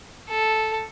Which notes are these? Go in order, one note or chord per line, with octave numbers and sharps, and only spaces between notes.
A4